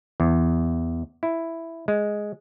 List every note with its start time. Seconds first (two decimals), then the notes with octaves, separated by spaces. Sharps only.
0.20 E2
1.23 E4
1.88 G#3